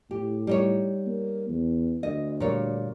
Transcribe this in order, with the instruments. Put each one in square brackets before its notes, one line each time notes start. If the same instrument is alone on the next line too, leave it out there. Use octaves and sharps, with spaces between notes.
[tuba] A2 [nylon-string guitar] G4
[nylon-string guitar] G3 D#4 C#5
[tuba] A#3
E2
[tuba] D2 [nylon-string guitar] D#5
[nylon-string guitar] A#2 G3 C#5